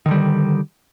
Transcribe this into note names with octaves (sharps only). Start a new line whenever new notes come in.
D3 D#3 G3